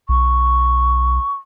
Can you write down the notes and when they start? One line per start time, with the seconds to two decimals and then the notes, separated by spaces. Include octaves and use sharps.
0.09 B1 C#6